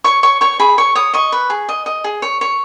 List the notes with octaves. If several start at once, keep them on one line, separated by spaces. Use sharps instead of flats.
C#5 C#6
C#5 C#6
C#5 C#6
G#4 B5
C#5 C#6
C#5 D#6
D#5 C#6
B4
G#4
D#5
D#5
G#4
C#5
C#5